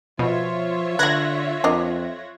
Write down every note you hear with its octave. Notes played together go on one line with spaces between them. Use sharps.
B2 F3 F4 C#5 E5
D3 A3 B4 F#6 G#6 A#6
F2 D4 A#4 D#5